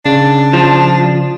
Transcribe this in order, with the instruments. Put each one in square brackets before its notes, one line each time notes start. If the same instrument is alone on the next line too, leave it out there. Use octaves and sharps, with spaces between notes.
[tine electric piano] C#3 [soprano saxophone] D4
[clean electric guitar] F3